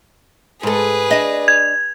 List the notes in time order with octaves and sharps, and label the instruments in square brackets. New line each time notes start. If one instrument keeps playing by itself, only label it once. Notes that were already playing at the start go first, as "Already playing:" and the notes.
[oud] G#2 A4 [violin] G#4 B4
[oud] D4 D#5
[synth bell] G#6